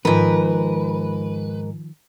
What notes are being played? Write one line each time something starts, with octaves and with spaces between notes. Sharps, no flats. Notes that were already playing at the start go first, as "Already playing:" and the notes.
G#2 D#3 F3 A#4 B4